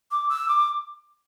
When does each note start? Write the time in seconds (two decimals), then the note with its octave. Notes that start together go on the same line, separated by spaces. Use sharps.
0.12 D6
0.30 E6
0.49 D6